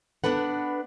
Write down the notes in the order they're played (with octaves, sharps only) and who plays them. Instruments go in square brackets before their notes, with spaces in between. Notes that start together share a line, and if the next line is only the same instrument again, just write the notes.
[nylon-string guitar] B3 D4 A4 B4 F#5